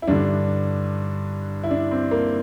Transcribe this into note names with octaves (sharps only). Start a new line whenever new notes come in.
E4
G2 D3 D4
E4
D4
C4
A#3